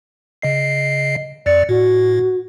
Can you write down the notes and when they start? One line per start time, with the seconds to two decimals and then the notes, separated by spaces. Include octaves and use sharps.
0.42 C#3 D#5 C7
1.46 F2 D5 A6 C#7
1.69 A2 F#4